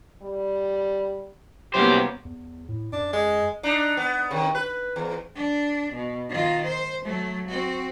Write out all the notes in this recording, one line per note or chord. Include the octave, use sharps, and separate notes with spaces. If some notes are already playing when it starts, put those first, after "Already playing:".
G3
C2 F#3 A#3 B3 C#4 G4 C5
E2
A2
F#2 D4
G#3
D4 D#4
B3
C3 D#3
B4
E2
D4
B2
D#3 F4
C5
F#3 A3
C4 F#4